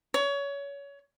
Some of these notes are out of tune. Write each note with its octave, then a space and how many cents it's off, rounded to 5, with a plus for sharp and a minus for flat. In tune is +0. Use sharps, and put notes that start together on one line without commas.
C#5 +25